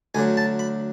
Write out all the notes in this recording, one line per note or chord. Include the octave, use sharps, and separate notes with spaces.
D2 D3 F#3 G#5
A5
B5